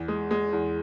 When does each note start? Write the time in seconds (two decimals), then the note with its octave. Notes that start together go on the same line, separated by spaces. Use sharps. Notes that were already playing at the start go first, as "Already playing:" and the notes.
Already playing: E2
0.08 G#3
0.31 G#3
0.53 E2